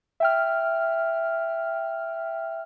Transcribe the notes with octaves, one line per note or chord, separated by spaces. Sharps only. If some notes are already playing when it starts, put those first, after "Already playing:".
E5 G5 F6